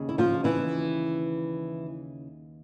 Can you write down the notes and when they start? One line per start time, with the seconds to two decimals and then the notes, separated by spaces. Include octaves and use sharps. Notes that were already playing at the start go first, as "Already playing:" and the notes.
Already playing: D#2 C#3
0.09 E4
0.18 F3 F4
0.44 E3 E4